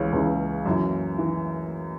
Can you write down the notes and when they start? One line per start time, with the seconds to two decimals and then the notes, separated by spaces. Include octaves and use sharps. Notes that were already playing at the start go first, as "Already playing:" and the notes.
Already playing: C#2 C#3 E3 C#4
0.12 C#2 C#3 E3
0.66 F#2 E3
1.18 E3